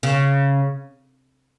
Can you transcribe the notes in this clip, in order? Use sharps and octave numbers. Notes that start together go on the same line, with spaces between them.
C#3